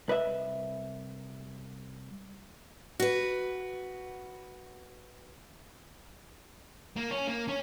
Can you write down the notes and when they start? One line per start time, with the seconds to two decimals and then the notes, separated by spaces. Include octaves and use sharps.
0.08 C2 B4 D#5 E5
3.00 F#4 B4
6.97 A#3
7.11 C#4
7.28 A#3
7.48 C#4